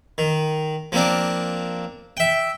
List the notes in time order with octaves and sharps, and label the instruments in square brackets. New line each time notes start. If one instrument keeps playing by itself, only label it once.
[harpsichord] D#3
F3 A#3 C4 D4
E5 G5